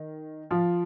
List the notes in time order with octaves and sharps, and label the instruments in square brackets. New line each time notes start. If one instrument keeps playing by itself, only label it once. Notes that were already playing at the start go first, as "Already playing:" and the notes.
Already playing: [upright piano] D#3
F3 F4